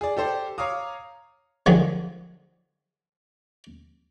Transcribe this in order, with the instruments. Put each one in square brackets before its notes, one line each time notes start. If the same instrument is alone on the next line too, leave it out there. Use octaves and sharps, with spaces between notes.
[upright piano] G#4 D5
G4 A4 C5 D5
C#5 F5 A#5 D6 D#6
[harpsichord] D3 D#3 F3 F#3 G#3